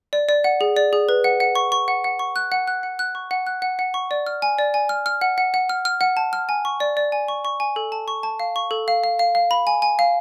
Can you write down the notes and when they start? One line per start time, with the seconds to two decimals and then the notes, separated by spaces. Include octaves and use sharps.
0.13 D5
0.29 D5
0.44 F#5
0.61 G#4
0.76 D5
0.93 G#4
1.09 B4
1.24 F#5
1.40 F#5
1.55 C#6
1.72 C#6
1.88 F#5
2.04 F#5
2.19 C#6
2.36 F#6
2.52 F#5
2.67 F#6
2.83 F#5
2.99 F#6
3.15 C#6
3.31 F#5
3.47 F#6
3.62 F#5
3.79 F#5
3.94 C#6
4.11 D5
4.27 F6
4.42 G#5
4.59 D5
4.74 G#5
4.89 F6
5.06 F6
5.21 F#5
5.38 F#5
5.54 F#5
5.69 F6
5.85 F6
6.01 F#5
6.17 A5
6.33 F6
6.49 G#5
6.65 C#6
6.80 D5
6.97 D5
7.12 G#5
7.28 C#6
7.45 C#6
7.60 G#5
7.76 A4
7.92 A5
8.08 C#6
8.23 A5
8.40 F5
8.56 C#6
8.71 A4
8.88 F5
9.04 F5
9.19 F5
9.35 F5
9.51 B5
9.67 G#5
9.82 G#5
9.99 F5